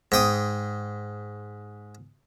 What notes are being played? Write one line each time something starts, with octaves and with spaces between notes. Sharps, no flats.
G#2 G5 D#6